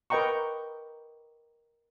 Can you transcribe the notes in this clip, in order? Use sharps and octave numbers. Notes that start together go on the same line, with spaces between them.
A#4 B4 D#5 G5 A#5 C#6